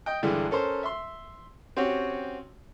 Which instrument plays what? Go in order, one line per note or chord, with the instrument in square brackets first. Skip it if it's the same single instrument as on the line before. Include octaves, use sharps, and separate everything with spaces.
[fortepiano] D#5 G5
G2 D3 E3 G#3
C#4 A4 A#4 C5
E5 C6
C4 C#4 F#4 G4 C#5